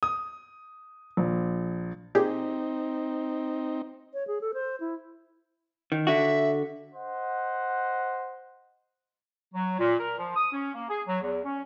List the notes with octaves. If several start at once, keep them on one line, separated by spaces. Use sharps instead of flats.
D#6
A#1
A#2 C4 D#4 G4 G#4
C#5
G#4
A4
C5
E4
D#3
D3 F#4 E5
C5 D#5 F#5
F#3
A#2
A#4
F3
D#6
C#4
A#3
G#4
F#3
E2
C#4